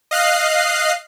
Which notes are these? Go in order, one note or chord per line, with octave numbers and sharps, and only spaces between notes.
D#5 F5 F#6 C7